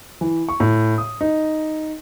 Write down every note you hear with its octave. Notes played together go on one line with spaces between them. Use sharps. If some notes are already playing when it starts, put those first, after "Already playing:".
E3
C#6
A2
D#6
D#4